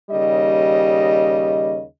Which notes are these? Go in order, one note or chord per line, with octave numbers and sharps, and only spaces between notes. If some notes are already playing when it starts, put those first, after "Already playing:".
D#2 C#3 G3 D#5